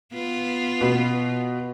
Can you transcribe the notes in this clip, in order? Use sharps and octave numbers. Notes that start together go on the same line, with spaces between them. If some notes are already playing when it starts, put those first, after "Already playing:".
B3 F4
B2